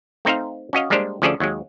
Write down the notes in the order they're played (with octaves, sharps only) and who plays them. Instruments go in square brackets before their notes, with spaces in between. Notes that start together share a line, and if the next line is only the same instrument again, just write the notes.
[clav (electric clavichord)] A3 C4 D#4 C5 F5
C#4 F#4 D#5 F5
G3 G#3 A#3 D4 G4 C5
D2 F3 C#4 G#4 A4 D5
D#2 F#3 G#3